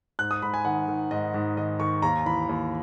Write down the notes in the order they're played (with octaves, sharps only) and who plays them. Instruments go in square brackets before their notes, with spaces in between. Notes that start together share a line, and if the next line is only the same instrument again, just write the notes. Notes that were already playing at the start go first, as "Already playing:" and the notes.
[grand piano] G#2 F#6
D#6
G#2 B5
G#5
D#3 F#5
D#3
G#2 D#5
G#2
D#3 D#5
D#3 C#6
D#2 A#5
E3 B5
D#2